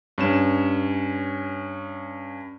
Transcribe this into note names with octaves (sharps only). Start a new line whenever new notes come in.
G2 C#4 E7